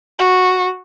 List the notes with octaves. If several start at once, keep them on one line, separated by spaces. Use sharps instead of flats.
F#4